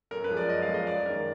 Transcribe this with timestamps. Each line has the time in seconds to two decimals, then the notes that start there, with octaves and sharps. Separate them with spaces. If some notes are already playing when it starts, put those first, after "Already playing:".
0.11 F#2 A#4
0.24 B4
0.30 F3 G#3
0.37 D5
0.49 F#2 D#5
0.62 F5
0.69 F3 G#3
0.74 D#5
0.87 F#2 D5
1.06 D#3 G#3 A#4